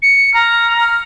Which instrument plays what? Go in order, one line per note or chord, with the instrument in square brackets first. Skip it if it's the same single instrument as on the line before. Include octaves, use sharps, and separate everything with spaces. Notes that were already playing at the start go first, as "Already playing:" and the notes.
[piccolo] C#7
[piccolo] A#5 [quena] F6
[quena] F6